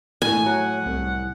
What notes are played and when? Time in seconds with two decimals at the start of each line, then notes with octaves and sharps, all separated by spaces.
0.22 A2 G#5
0.46 F#3 F#5
0.86 C2